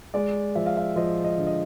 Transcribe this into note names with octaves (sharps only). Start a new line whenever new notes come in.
G#3 D5
F3 E5
F5
E5
F3 D#5
D#5
D3
D#5